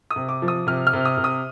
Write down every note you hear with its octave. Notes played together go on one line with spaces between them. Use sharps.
D#6
C3
D6
F3
D#6
C3 F6
F6
C3
D#6
C3
D#6